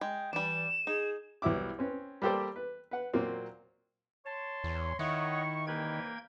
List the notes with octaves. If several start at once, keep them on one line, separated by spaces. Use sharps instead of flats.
G#3 G5
E3 G3 D4 E7
D#4 G#4
C2 F#3 B3 E4 D6
C4 C#4 B4
G3 A#3 G4 A4 C5 D5
B4
B4 F#5
A#2 F#3 A#3 C4
C#5 A5 C6
E2
D#3 E4 C#5 D#5 F#5 C#6
C2 E3 A#3 B4 G5 G#6